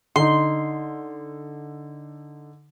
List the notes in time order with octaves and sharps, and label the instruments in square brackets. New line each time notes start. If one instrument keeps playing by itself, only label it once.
[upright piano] D3 D#4 [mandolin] C6